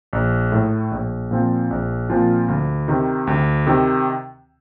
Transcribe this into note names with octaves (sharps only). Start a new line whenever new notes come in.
A#1
A2 A3
A#1
A#2 F3 C4 F4
A#1
A#2 F3 C4 F4
D2
C3 D#3
D2
C3 D#3